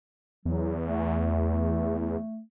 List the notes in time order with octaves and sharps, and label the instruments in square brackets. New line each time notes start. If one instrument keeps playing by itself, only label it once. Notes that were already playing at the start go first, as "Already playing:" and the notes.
[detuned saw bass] E2 [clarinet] F#3
[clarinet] A3
A3